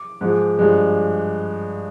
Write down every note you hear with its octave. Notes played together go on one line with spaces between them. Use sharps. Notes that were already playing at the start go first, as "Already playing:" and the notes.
Already playing: D6
G#2 F3 G#3
G2 F3 G#3